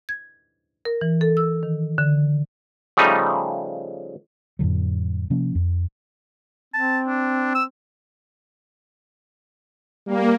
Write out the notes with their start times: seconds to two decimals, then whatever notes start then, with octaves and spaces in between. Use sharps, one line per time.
0.09 G#6
0.85 A#4
1.01 E3
1.21 A4
1.37 E6
1.63 D#3
1.98 D3
2.97 C#3 F3 G3 A3 D#4
4.59 F2 A2 D3 F#3
5.30 C3 F3 A#3 C#4
5.55 F2
6.74 C4 A5
7.07 D4
7.55 E6
10.07 G3 A#3